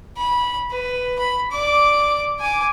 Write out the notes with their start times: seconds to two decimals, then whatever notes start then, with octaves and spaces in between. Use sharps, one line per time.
0.17 B5
0.70 B4
1.19 B5
1.51 D5 D6
2.40 G#5 D6